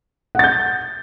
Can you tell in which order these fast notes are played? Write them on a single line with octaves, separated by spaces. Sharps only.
F#5 A6 G6